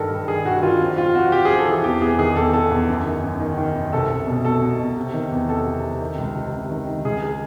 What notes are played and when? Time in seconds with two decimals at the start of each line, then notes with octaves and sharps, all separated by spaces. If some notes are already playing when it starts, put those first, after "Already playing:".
Already playing: G2 D#3 A4 A#4
0.11 G2
0.28 D#3 G#4
0.45 G2 F#4
0.57 F#4
0.63 D#3 F4
0.80 F2
0.97 F2 F4
1.15 F2 F#4
1.32 F2 G4
1.45 F2 G#4
1.58 A4
1.67 E3 G#4
1.84 E2 G4
2.01 E2 G#4
2.19 D#3 G#4
2.36 E2 A4
2.53 E2 A4
2.71 E2
2.89 F#2
3.06 D#3
3.23 F#2
3.40 D#3
3.58 D#3
3.75 F#2
3.93 C2 A4
4.10 C2
4.27 B2
4.45 B2 A4
4.62 B2
4.79 B2
4.96 C3
5.14 D#3
5.31 E2
5.48 C3 A4
5.66 C3
5.83 C3
6.01 D#3
6.18 C#2
6.35 C3
6.53 C3
6.71 D#3
6.87 D#3
7.05 C#2 G#4
7.22 G#4